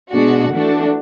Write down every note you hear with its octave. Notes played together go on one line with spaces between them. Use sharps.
B2 G#3 D4 F#4
E3 A3 D4 F#4